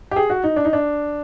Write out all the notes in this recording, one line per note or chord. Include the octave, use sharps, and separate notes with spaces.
G4
G#4
F#4
D#4
D4
D#4
D4